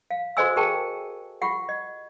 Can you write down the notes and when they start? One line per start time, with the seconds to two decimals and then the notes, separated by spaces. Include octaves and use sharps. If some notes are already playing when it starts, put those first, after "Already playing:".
0.11 F5
0.37 F#4 A4 C5 D#5 G#5 E6
0.56 G4 G#4 A#4 G5 A5
1.42 F4 G4 F#5
1.69 D#5